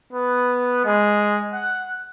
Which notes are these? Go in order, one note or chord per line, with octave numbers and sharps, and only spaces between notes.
B3
G#3
F#5